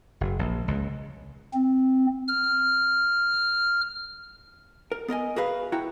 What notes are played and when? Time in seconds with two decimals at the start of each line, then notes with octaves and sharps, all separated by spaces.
0.21 F#1
0.39 A#1
0.68 C#2
1.54 C4
2.28 F6
4.92 A#4
5.08 B3 A#4 D#5 G#5
5.36 F#4 G#4 A#4 B4 E5 F5
5.72 E4 F#4 G5 A#5